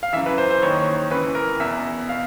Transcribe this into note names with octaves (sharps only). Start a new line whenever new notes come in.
F5
F#2 C#3 E3 E5
B4
C5
C5
D#2 D#3 C#5
C#2 C#3 E3 B4
A#4
E2 B2 E5
B2 F5